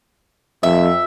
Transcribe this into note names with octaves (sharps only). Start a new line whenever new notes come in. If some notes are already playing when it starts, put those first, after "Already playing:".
F2 E5